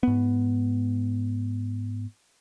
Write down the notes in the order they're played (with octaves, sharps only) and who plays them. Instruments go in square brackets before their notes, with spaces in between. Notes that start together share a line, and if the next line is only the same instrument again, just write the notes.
[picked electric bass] G#2 B3